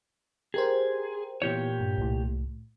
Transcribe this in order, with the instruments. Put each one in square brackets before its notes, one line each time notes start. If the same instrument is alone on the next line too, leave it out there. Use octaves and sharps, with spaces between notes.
[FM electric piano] G4 A#4 C5 [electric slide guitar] G#4
[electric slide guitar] A#2 G4 C#5 [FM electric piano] E3 B3
[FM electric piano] G2
C2 A2